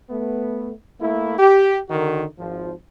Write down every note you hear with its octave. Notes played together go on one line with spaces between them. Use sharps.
A3 B3
A3 A#3 E4
G4
D3 D#3 F#4 A#4
G#1 F3